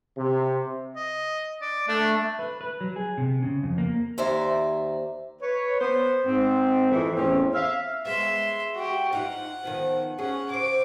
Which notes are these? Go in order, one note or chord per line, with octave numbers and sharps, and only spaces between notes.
C3
D#5
D5
A3 D4
B4
B4
F#3
G#4
C3
C#3
F2
A#3
D#2 C5 D5 E5 A#5
B4 C#5
B3 C5
G#2 C4
F2 E3
E2 A2 C4 C#4
E5 F5
G#3 B3 E5 C6
F#4 G4
D#4 F4 F#5
D#3 F3 B3
C#4 G#4 F#5
C#3 C5 D6